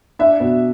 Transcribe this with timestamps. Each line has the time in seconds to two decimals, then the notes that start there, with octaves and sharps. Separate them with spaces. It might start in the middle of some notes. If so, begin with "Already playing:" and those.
0.19 D4 E5
0.40 B2